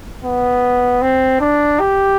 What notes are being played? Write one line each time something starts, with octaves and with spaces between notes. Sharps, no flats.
B3
C4
D4
G4